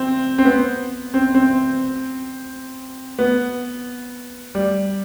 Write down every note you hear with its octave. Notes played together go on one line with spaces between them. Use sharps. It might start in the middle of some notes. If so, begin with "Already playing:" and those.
Already playing: C4
C4
B3
C4
C4
B3
G3